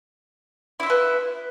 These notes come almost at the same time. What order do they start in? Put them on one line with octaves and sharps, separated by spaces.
E4 E5 F4 B3